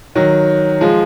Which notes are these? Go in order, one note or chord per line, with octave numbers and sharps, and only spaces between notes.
D#3 F#3
F3 G#3